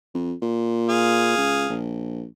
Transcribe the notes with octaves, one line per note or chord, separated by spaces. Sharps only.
F2
A#2
G#4 F5
C#2
A#1